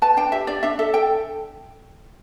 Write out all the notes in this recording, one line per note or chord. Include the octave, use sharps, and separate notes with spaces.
B4 A5
D4 G5
G4 E5
D4 D5
D4 E5
A4 E5
A4 G5